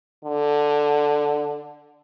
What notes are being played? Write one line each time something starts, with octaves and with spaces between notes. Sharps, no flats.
D3